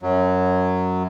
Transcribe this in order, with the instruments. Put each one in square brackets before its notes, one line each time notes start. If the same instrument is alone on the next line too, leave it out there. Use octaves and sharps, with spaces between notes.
[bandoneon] F#2 F#3